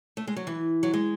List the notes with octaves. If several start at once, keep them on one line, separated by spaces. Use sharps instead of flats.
A3
G#3
F#3
E3
F#3
G#3